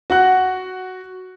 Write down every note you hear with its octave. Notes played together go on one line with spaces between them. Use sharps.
F#4 F#5 F#6